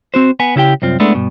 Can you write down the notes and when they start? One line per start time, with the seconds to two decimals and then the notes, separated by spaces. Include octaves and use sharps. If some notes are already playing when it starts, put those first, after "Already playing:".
0.14 C4 F#4 C5
0.40 B3 B4 G#5
0.56 C#3 E4 G4 G5
0.82 C2 F#2 C4 F4
1.00 G#3 A3 B3 D4 E4
1.14 G2 B2